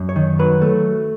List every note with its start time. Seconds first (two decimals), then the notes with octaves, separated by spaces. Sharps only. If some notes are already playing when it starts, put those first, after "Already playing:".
Already playing: F#2
0.09 C#5
0.16 D#3
0.39 F#3 B4
0.62 A3